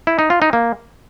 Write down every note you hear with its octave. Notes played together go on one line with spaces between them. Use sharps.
E4
D#4
F4
D#4
A#3